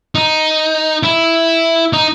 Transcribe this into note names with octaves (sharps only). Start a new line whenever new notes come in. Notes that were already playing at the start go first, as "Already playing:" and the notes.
D#4
E4
D#4